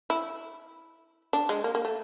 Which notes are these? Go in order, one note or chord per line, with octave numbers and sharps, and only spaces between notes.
E4
D4
G#3
A#3
A#3
A3